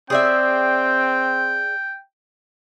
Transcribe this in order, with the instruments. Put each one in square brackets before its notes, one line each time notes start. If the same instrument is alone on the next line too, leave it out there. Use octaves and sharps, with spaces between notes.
[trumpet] C4 [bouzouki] G#4 D5 E5 [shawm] G5